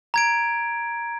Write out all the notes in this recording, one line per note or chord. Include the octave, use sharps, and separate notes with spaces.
A#5 G#6 D7